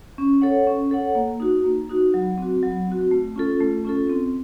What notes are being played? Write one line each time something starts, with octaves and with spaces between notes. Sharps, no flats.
C#4
A4 C#5 F#5
C#4
A4 C#5 F#5
A#3
D#4 F#4
A#3
D#4 F#4
F#3
C4 F#4
F#3
C4 F#4
A3
C#4 F4 A4
A3
C#4 F4 A4
C4